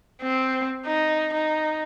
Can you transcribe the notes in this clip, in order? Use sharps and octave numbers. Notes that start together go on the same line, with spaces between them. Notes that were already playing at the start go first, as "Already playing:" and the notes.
C4
D#4
D#4